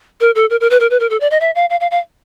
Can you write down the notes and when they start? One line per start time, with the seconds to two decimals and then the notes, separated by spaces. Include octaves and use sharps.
0.20 A#4
0.35 A4
0.50 A#4
0.60 A#4
0.70 B4
0.80 A#4
0.90 B4
1.00 A#4
1.10 A4
1.20 D5
1.31 D#5
1.40 E5
1.55 F5
1.70 F5
1.80 F5
1.91 F5